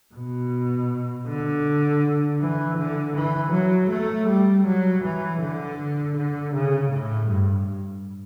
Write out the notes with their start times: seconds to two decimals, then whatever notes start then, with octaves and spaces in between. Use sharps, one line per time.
0.14 B2
1.27 D3
2.40 E3
2.77 D3
3.15 E3
3.52 F#3
3.90 A3
4.28 G3
4.65 F#3
5.03 E3
5.40 D3
6.16 D3
6.53 C#3
6.91 A2
7.28 G2